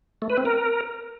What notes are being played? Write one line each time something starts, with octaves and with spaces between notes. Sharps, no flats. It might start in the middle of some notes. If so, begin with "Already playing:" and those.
A3
B4
C4
A#4